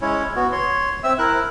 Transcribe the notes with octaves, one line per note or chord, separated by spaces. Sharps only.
G#3 C#4 E4 C#5
B3 F#4
C#5 C6
C4 E5 E6
E4 A#4 F#6